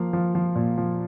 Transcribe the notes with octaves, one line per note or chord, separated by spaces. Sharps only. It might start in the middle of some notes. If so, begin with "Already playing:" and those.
Already playing: F3 A#3 F5
F3
F3
A#2
F3